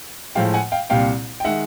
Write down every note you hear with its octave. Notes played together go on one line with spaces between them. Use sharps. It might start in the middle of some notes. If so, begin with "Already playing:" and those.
A2 F3 G#3 F5 G5
F#5 G#5
F5 G5
C2 A#2 G3 F5 G5
G5
D#3 G#3 E5 F#5